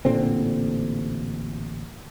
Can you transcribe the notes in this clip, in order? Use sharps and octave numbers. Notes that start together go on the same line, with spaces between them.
A1 A#2 D3 C4